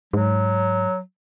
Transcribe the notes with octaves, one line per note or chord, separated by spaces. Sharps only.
G#2 F#3